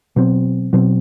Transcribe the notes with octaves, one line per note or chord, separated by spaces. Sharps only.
B2 F#3 C4
B2 F#3 C4